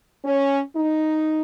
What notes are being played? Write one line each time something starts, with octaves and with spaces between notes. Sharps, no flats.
C#4
D#4